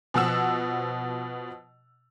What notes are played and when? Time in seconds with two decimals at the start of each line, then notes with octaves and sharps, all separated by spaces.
0.14 B2 F3 F#5 E6